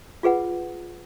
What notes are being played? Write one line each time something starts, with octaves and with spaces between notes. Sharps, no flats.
F4 G#4 B4 F#5